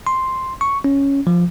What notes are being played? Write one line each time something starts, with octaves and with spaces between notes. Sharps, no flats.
C6
C#6
C#4
F3